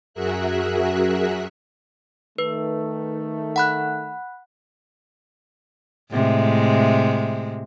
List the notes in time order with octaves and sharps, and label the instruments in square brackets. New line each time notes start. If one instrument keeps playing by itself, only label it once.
[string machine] F#2 F#4 G#4 A#4 E5 F#6
[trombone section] D#3 A3 [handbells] B4
[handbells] F#5 B5 F#6
[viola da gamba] A2 C3 G#3